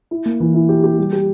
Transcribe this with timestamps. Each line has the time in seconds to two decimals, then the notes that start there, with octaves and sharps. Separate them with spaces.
0.11 E4
0.26 A#3
0.40 E3
0.54 E4
0.69 G4
0.84 G4
0.98 G3
1.13 G4